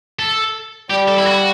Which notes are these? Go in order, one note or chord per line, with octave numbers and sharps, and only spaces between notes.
A4
G3 G4
A4
E4
F#4